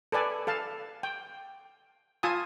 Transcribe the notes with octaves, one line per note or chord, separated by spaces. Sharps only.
A4 B4 D5 G#5
A4 F5 A5
G5
F4 G#5 A5 D#6